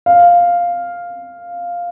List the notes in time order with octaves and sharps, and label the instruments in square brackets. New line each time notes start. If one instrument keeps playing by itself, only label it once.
[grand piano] F5